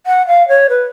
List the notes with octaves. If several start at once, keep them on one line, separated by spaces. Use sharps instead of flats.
F#5
F5
C#5
B4